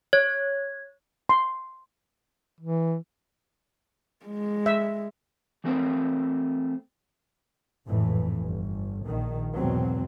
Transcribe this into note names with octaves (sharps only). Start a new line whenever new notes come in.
C#5 G#6
C6
E3
G#3
E5
E3 F#3 A3 C4 A#4 C5
G#1 F2 A2 E3 A3
G1
A#1 D#3
E2 G#2 B2 F#3 C4